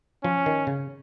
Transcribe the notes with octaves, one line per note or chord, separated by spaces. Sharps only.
F3 C#4
D#3
C#3